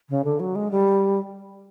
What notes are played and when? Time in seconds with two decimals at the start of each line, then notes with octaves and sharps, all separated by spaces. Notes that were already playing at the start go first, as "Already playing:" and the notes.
0.09 C#3
0.25 D3
0.40 F#3
0.56 G#3
0.71 G3